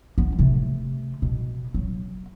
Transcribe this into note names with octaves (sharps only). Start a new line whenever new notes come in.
B3 E4
C3 A3
B2
F#3